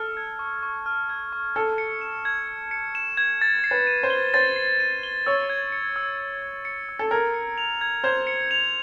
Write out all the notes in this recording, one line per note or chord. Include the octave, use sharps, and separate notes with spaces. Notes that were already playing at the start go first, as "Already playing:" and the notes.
Already playing: A4 F6
G#6
C#6
C#6
F6
G#6
C#6
A4 G#6
C#7
E7
G#6
G#6
C#7
E7
G#6
A6
C7
B4
D#7
C5
G7
C5 A6
C7
D#7
G7
C#5 E6
G#6
C#7
E6
E6
G#6
C#7
E6
A4
A#4 G#6
C#7
F7
G#6
C5 G#6
C#7
F7